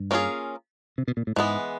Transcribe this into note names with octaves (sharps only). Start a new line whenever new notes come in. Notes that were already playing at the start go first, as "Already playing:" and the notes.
Already playing: G2
A#3 C#4 F4 G#4
C3
B2
A#2
A2
G#2 E3 G#3 B3